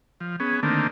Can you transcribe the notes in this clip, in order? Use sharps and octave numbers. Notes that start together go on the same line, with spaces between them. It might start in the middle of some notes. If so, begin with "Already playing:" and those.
F3
B3 C#4 G#4
D3 D#3 A3 A#3 C4 D4